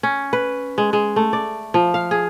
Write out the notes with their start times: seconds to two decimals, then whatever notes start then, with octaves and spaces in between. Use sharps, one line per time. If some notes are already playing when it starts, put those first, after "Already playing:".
0.03 C#4
0.33 B4
0.78 G#3
0.93 G#3
1.16 A3
1.33 D5
1.74 F3
1.94 F5
2.11 G#4